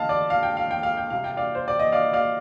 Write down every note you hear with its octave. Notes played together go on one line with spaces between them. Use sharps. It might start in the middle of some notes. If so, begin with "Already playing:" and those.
Already playing: D3 A3 D#5 F5 A5
D5
F5
G5
F5
G5
F5
G5
C3 G3 F5
G5
D5 F5
C5
D5
D#5
D5 F5
D5 F5